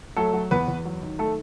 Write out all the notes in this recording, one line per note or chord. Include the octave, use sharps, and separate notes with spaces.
F#3 A3 A4
F#3
E2 B3 B4
E2
F#3
D#3
A3 A4